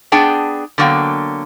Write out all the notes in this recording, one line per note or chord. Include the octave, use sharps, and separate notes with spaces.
B3 D4 G#4 G5 A5
D3 F#3 A#3 B3 G5